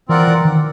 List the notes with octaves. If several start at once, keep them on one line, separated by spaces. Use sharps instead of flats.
E3 C4 F4 A#4 D5 F#5
E3
D#3